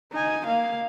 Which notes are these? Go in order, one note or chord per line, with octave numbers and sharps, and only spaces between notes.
D#4 G#5
A#3 F5